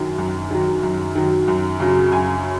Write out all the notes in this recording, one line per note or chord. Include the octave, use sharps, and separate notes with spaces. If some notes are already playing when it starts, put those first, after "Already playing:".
Already playing: F#2 D#3 F#3
F#2
D#3 F#3
F#2
D#3 F#3
F#2
C#3 F#3
F#2 G#5